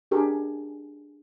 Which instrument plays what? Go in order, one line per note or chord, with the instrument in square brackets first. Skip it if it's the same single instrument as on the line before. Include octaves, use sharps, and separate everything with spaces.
[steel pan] D4 G4 G#4 A#4